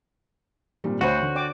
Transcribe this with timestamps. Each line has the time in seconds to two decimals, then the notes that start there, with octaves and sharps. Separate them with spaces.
0.84 G#1 A#2 G3
1.01 D2 F#4 C5 C#5 F#5 B5 D#7
1.22 D3
1.35 D5 G5 D6